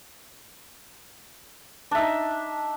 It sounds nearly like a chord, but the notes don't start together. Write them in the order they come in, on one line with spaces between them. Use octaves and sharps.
D4 E5 D#4